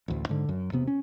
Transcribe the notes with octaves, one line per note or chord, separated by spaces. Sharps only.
A1 D2
G#2 D3
F#2
E1 C3 B3
C#4